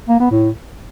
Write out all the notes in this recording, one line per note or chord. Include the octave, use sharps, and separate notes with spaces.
A#3
B3
A2